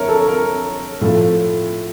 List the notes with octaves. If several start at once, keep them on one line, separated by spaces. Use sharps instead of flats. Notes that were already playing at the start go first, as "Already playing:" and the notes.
Already playing: F2 D3 A#4 C#5 E5
A4
A#4
A2 F3 A3